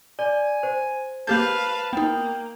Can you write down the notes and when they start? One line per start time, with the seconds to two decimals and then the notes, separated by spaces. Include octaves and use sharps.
0.19 D5 G#5
0.63 C5
1.27 A#3 G4 B4 F5 A5 G6
1.93 A#3 B3 D#4 G5